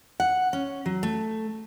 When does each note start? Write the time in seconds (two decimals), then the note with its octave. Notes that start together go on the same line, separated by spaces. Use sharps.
0.20 F#5
0.53 C#4
0.86 F#3
1.03 A3